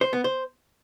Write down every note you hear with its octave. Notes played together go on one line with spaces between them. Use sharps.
C5
B3
C5